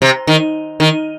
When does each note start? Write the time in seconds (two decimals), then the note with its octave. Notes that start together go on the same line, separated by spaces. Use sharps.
0.02 C3
0.27 D#3
0.80 D#3